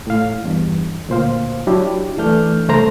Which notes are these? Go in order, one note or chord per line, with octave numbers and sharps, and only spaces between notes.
A2 F5
E2 G2
D2 A#2 C5 F5
F#3 D4 E4 F#4 G4
E3 A3 D4 F6 G6
C2 A3 C5 A#5